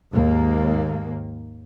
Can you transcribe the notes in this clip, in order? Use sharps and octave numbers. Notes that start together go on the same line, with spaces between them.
D#2 G#2 A#3